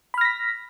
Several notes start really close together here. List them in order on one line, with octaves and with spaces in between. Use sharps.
B5 F6 A#6 B6